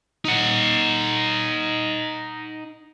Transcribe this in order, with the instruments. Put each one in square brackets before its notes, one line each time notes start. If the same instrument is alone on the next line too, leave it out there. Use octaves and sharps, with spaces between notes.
[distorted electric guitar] D#4 F#5